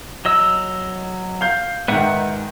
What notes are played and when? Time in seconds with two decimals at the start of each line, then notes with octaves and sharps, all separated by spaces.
0.25 F#3 D#5 E6
1.41 F5 G6
1.88 G#2 D#3 B4 E5 F#5